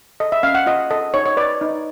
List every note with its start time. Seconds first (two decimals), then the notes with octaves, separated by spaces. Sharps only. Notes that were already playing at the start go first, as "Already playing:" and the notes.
0.20 A4 D#5
0.32 E5
0.43 C#4 F5
0.55 F#5
0.66 F4 D#5
0.91 A4 D#5
1.14 D#4 C#5
1.26 C#5
1.37 B4 D5
1.61 D#4